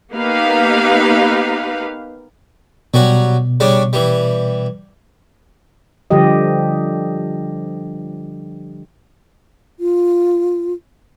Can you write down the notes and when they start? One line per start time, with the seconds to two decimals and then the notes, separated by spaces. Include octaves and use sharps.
0.13 A#3 B3 D#4 G4 B4 F5
2.94 B2 F#3 G3 F#4
3.60 C#3 G3 D4
3.93 E3 G3
6.10 D3 F3 G3 G4 D#5
9.79 F4